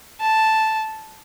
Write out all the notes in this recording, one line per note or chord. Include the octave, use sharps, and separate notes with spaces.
A5